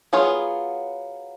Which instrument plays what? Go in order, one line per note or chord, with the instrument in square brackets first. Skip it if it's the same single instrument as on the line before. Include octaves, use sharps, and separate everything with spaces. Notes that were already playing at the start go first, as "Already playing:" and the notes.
[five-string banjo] F#3 B3 F4 G#4 C#5